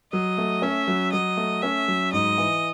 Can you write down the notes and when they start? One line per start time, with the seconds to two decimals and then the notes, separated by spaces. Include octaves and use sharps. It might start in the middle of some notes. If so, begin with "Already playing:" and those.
0.13 F#3 D#5
0.38 A3
0.62 C#4 E5
0.88 F#3
1.12 F#3 D#5
1.37 A3
1.62 C#4 E5
1.88 F#3
2.13 G#2 D#5
2.38 E3